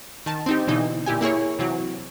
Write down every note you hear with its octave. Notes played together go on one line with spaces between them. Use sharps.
D#3 A5
C4 D#4 G4
B2 D3 E3 D#4
A#2 E4 G4 G#5
A#3 E4 G#4 C#5
C3 E3 F#3